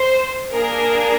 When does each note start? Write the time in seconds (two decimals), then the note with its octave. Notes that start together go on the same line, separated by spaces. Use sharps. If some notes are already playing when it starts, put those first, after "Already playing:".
Already playing: C5
0.53 A#3 D4 G#4 A#4